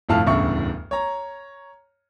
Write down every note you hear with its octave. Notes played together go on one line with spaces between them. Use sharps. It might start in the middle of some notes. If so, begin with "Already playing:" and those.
G1 F2 A2 F5 A5 F6
D1 E2 G2 C#3 E5 C#6
C#5 A#5